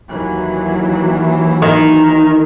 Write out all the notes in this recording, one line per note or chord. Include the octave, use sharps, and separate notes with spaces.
D#2 E3 F#3
D#3